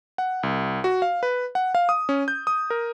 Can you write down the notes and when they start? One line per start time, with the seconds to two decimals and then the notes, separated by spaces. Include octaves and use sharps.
0.18 F#5
0.43 C2
0.84 F#4
1.02 F5
1.23 B4
1.55 F#5
1.75 F5
1.89 D#6
2.09 C#4
2.28 G6
2.47 D#6
2.70 A#4